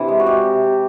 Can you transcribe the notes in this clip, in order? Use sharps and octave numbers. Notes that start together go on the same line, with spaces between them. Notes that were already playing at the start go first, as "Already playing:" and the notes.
Already playing: C3 E3 D4
G#3
F#4
G#3 G4
C3
C3